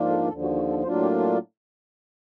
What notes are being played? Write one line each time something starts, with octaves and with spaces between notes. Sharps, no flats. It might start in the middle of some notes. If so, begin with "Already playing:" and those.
Already playing: G#2 F3 A#3 D4 F4
A4
D#2 D3 F3 A4
F#4
F#4
A4
A2 F#3 A#3 D4 F4 C5
G4
G4